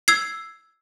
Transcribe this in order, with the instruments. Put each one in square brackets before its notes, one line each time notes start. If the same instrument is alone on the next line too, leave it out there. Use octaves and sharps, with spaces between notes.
[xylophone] E6 G#6 C7